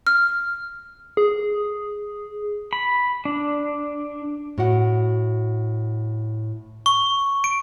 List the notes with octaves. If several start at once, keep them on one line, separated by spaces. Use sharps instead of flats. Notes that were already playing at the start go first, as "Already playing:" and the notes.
F6
G#4
B5
D4
A2 F#4 F#5
C#6
D7